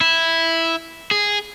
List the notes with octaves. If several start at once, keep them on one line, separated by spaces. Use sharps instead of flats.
E4
G#4